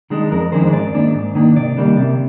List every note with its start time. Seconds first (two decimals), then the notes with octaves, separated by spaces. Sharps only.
0.10 D#3 G#3 D4
0.31 F2 A#4
0.52 D#3 G#3 D4 C5
0.73 G#2 D5
0.94 D#3 A#3 D4
1.14 G#2
1.35 D#3 A#3 D4
1.56 C3 D5
1.77 D#3 G3 A#3 D4
1.97 C3